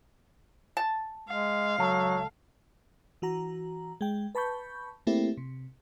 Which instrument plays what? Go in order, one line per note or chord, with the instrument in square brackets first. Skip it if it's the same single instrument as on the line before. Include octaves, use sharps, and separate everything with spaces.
[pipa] A5
[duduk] G#3 [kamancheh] F5
[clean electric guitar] C#2 A4 [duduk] F#3
[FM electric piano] E3 F#4 A#5
G#3 G5
B4 A5 B5 C#6 G6
A3 A#3 C4 E4 G4
C3